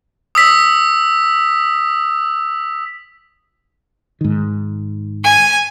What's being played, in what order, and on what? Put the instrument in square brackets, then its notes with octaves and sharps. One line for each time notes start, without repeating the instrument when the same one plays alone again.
[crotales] D#6 E6 B6
[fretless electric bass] G#2 D#3
[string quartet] G#5